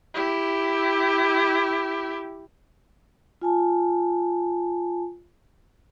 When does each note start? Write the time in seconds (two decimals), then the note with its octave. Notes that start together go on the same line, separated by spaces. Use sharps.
0.14 E4 G4
3.42 F4 G#5 A5